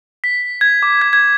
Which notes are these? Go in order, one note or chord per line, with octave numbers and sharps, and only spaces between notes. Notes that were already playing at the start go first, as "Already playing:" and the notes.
B6
G#6
D6
G#6
G#6